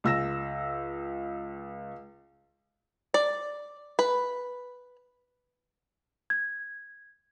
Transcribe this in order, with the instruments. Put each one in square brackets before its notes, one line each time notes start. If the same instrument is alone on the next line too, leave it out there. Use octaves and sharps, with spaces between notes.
[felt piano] C#2 E6 A#6 E7
[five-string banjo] D5
B4
[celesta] G#6